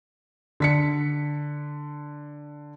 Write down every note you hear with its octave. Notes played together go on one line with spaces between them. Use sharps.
D3 B6 C#7